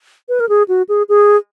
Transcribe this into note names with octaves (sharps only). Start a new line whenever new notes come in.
B4
A#4
G#4
F#4
G#4
G#4